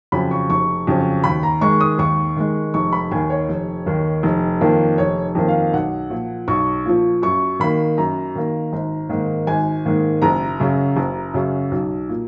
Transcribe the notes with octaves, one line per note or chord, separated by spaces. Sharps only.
F2 C#3 F#3 B5
C#6
F1 C#6
F2 C#3 F#3
D#2 B5
A#5
D#3 G#3 C#6
D#6
D#2 C#6
D#3 G#3
F1 C#6
B5
D#2 D#3 G#5
C#5
F1
D#2 D#3
F1
F2 D#3 A#3
F1 C#5
F2 D#3 A#3
F5
B1 F#5
A#2 F3
B1 C#6
A#2 F3
F#2 C#6
D#3 A#3 B5
F#2 A#5
D#3 A#3
G#1
G#2 D#3 A#3
G#1 G#5
G#2 D#3 A#3
F#1 A#5
F#2 C#3 F#3
F#1
F#2 C#3 F#3
B1
A#2